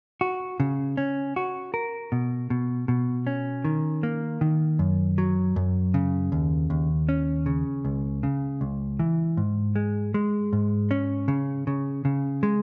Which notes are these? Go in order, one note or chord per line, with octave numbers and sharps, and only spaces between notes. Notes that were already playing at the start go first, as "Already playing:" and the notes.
F#4
C#3
C#4
F#4
A#4
B2
B2
B2
C#4
D#3
A#3
D#3
F#2
F#3
F#2
C#3
D#2
D#2
C#4
C#3
C#2
C#3
C#2
E3
G#2
G#3
G#3
G#2
C#4
C#3
C#3
C#3
G#3